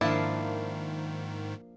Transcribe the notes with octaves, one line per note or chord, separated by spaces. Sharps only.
G#2 D#3 F3 A#3 D4 E4 F5 A5